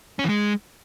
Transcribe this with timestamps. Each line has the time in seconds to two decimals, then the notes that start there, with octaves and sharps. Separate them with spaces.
0.19 C#4
0.24 E3
0.29 G#3